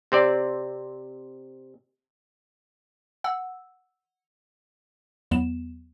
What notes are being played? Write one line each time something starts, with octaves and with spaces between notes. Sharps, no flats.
C3 C4 D5
F#5 E6
E2 F#3 B3 E7